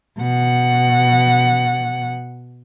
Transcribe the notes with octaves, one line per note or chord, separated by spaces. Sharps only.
B2 F#5